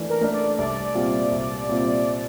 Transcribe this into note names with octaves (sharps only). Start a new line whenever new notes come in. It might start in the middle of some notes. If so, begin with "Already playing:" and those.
Already playing: E3 A3 D4 A4
A#4
A3 D4 A4
D5
C2 D5
A#2 G3 C4 F4
C2
A#2 G3 C4 F4